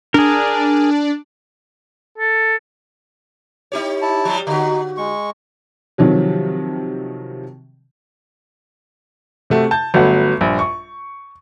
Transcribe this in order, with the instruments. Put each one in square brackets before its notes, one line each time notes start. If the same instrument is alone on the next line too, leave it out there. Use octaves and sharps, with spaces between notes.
[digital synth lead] D4 [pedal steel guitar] G#4 A#4
[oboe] A4
[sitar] D#4 G4 C#5
[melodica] E4 A5
[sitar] F3 G3
[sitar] D3 F#4 [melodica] D#4
[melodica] G#3 C#6
[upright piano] C3 D#3 F3 F#3
C3 A3 F#4
A5 G6
G1 F#3 A3 B3 F#5
A#1 G2
C#6